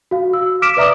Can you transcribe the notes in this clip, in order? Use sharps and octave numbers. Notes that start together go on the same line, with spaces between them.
F#4 F5
E6
D6 F6 B6 D7 E7
B4 D5 E5 A#5 D6 D#6